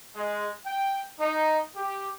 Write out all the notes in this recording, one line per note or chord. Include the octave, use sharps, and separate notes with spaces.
G#3
G5
D#4
G4